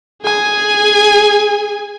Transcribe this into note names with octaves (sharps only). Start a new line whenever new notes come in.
G#4 G#5